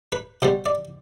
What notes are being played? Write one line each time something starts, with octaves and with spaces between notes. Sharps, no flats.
B4
B2 G3 C5
D5